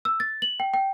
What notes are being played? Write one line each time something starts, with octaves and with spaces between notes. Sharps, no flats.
E6
A6
F#7
G5
G5